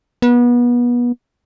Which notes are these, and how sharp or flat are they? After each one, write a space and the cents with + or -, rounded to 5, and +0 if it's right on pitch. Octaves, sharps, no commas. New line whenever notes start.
B3 -30